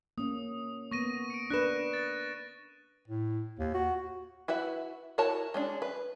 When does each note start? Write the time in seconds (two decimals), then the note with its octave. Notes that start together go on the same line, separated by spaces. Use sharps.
0.18 A#3 C#4 D#6
0.91 A#3 B3 C#6 A#6 D#7
1.30 C#7 D7
1.50 D4 A#4 B4 F#6 A#6 E7
1.93 A6
3.08 A2
3.59 D#2
3.74 F#4
4.48 E4 F#4 B4 E5
5.18 E4 F#4 A#4 C#5 A5
5.54 G#3 C#4 D4
5.82 B4